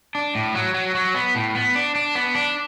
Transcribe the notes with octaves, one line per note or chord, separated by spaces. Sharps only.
D4
A2
F#3
F#3
F#3
B3
A2
B3
D4
D4
B3
D4